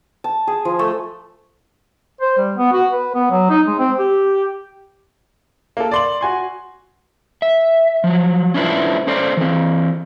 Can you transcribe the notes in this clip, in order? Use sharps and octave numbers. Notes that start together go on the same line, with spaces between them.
A5
G#4
F3
A3
C5
G3
B3
F#4
B4
B3
F#3
D#4
G#3
C4
G4
A#3 A4
D5 C6 F#7
F#4 G#5 C6
E5
F3 F#3
C#4 D4 E4 F4 B4 C5
C#4 A4 C5 D5
E3 C4